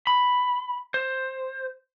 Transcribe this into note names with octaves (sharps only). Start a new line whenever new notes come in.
B5
C5